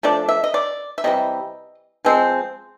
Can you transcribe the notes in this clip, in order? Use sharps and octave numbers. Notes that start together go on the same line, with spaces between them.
F3 A3 D4 D5
E5
D#5
D5
E5
C3 E3 G3 D#5
F3 G#3 C4